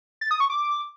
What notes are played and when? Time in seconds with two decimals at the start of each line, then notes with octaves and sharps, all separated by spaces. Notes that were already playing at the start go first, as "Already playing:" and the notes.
0.21 A6
0.31 D#6
0.40 C#6
0.50 D6